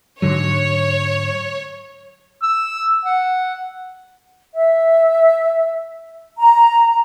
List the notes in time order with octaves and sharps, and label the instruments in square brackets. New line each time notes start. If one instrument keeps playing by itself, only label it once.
[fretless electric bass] G#2 D3 F#3 [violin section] C#5
[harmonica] E6
F#5
[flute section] E5
A#5